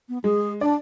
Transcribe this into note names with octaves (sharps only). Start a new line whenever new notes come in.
B3
G#3 G#4
D4 D5